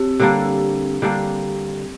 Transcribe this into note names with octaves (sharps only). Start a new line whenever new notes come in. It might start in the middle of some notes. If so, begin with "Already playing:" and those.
Already playing: C4 G4
D3 G3 A#3 D4 G4
D3 G3 A#3 D4